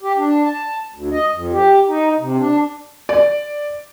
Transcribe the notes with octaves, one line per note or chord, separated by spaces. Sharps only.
G4
D4
A5
D2
D#5
F2
G4
D#4
C3
D4
D5